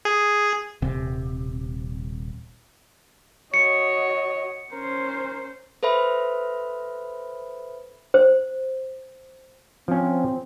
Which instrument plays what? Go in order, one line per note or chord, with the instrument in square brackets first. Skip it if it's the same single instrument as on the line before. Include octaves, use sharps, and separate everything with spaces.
[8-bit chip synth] G#4
[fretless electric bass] D#1 C3
[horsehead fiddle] F#4 D#5 [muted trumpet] C#5 [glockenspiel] C#7
[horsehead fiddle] C#4 C5 [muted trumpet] A#4
[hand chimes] A4 B4 C5 E5 B5
[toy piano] C5
[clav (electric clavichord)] F3 C#4 [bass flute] C4